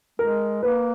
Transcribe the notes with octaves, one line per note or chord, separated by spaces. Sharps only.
G#3 A#4
A#3 B4